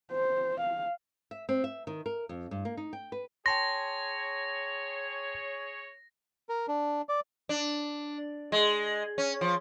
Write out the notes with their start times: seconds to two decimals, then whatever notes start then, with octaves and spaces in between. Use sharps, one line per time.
0.12 C5
0.60 F5
1.31 E5
1.49 C4
1.64 E5
1.87 D#3
2.06 A#4
2.29 F2
2.51 G2
2.65 A#3
2.77 D#4
2.93 G5
3.12 B4
3.46 G#4 C#5 G5 A5 C6 A#6
6.49 A#4
6.68 D4
7.09 D5
7.49 D4
8.52 G#3
9.18 C#4
9.41 F3